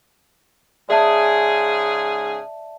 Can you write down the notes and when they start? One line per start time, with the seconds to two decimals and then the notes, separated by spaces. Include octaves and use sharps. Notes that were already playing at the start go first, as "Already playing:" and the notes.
0.89 G#2 C#3 G#4 D5 E5 A5